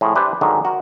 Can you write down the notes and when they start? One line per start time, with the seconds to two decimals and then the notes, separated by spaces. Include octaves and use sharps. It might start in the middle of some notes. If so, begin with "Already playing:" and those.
0.01 A2 F3 G#4
0.15 D4 E4 G4 B4 C5
0.41 G#2 D3 D#3 F#3 D#4 E5
0.65 F#4 A#4